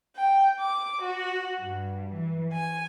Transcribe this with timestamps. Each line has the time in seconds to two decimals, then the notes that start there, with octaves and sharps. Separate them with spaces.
0.17 G5
0.60 D6
1.03 F#4
1.61 G2
2.14 E3
2.53 G#5